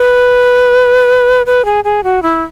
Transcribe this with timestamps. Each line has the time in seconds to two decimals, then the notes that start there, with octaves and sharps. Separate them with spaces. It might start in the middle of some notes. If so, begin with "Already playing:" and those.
Already playing: B4
1.46 B4
1.65 G#4
1.84 G#4
2.04 F#4
2.23 E4